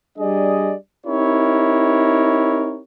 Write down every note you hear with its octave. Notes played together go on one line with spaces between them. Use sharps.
G3 D4 G#4 D5 D#5
C4 D#4 E4 G4 A#4 C#5